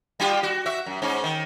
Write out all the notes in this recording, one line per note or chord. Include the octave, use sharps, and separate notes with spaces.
G3 F4 G4
F#4
F#4 E5
F#2
G#2 C#4
D#3